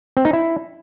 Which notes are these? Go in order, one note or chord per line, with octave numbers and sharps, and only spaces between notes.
C4
D#4
E4